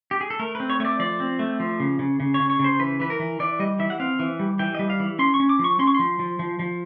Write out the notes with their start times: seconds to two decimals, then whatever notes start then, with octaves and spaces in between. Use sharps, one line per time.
0.11 G4
0.21 G#4
0.30 A4
0.39 A3 A#4
0.55 C4 B4
0.70 C#5
0.80 A3 C#5
0.85 D5
0.99 F3 D5
1.20 C4
1.39 A3
1.60 F3
1.80 C#3
1.99 C#3
2.20 C#3
2.34 C#5
2.39 C#3
2.50 C#5
2.59 C#3 C5
2.79 E3 B4
3.00 E3 B4
3.10 A#4
3.19 E3
3.39 E3 D5
3.59 G3 D#5
3.79 E3 E5
3.90 F#5
4.00 C4 F5
4.19 E3
4.39 G3
4.59 E3 G5
4.75 G3 D#5
4.90 F5
5.00 E3
5.19 C#4 C6
5.34 C#6
5.40 C#4
5.49 D6
5.59 F3
5.64 C#6
5.79 C#4 C6
5.87 C#6
5.95 F3 C6
6.19 F3
6.39 F3
6.59 F3